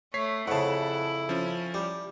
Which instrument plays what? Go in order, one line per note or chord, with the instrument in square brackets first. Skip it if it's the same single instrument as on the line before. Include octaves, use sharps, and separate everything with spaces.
[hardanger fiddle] A3 [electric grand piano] C#5 B6 C7
[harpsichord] F2 C#3 [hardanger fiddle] E4 [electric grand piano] F#5 A5
[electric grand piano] F3 C#4
[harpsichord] G3